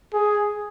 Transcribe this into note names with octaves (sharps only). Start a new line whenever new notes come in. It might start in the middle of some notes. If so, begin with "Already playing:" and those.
G#4